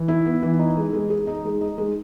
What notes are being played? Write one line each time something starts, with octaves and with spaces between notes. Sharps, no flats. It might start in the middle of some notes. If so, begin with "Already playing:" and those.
Already playing: E3
E4
B3
E3
D#4
G#3
G#3
G#4
D#4
G#3
D#4
G#3